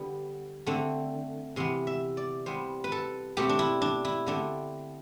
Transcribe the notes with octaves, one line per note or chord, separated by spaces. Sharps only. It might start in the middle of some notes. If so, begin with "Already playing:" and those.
Already playing: D3 G3 B3
D3 A3 C4
C3 E3 B3 C6
E5
D5
C3 G3 B3 C5
B4
A4
B2 A3 C4 G4
D4
E4
D4
E4
D3 A3 C4 D4